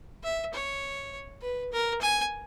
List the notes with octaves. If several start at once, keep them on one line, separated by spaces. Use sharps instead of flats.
E5
C#5
B4
A#4
G#5